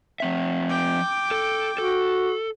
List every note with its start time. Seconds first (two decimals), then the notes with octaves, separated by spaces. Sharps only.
0.20 F3 C4 E5
0.70 G5 D6
1.31 A4
1.78 F#4 A4